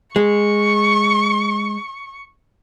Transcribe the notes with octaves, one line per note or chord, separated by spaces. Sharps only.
G#3 C#6